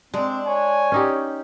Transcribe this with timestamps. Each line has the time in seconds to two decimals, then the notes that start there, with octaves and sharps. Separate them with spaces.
0.14 G#3 C4 D4
0.46 C#5 G#5
0.92 C#4 D#4 G4